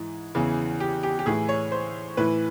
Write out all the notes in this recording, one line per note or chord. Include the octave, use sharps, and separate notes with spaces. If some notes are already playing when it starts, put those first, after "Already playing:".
Already playing: G#2 E3
E2 C#3 E3
G4
G4
G4
A2 E3 G#4
C#5
C5
A2 E3 B4